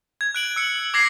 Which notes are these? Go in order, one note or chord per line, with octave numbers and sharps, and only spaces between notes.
G#6
F#6 D7 F#7
E6 C#7
D6 G#6 A#6 C7